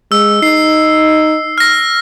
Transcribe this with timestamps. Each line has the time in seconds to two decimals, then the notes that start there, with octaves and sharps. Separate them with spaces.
0.12 G#3 E6
0.42 D#4 C7
1.58 F6 A#6